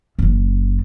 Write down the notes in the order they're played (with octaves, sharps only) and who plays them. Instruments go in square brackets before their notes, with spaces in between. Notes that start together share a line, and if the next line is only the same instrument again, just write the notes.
[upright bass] F#1 F#2